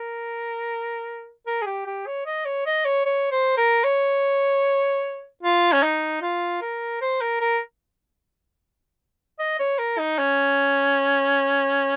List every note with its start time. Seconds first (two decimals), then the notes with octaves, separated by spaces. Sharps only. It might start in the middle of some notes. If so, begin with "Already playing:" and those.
Already playing: A#4
1.47 A#4
1.62 G#4
1.66 G4
1.86 G4
2.07 C#5
2.26 D#5
2.46 C#5
2.66 D#5
2.85 C#5
3.05 C#5
3.31 C5
3.58 A#4
3.84 C#5
5.43 F4
5.73 C#4
5.83 D#4
6.22 F4
6.62 A#4
7.01 C5
7.21 A#4
7.41 A#4
9.39 D#5
9.59 C#5
9.79 A#4
9.98 D#4
10.18 C#4